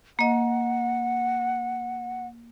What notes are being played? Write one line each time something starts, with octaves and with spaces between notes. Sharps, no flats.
A#3 D#5 F#5